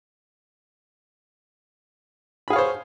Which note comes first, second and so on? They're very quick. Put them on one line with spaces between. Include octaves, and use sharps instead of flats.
B5 G#4 F5 C#5 C5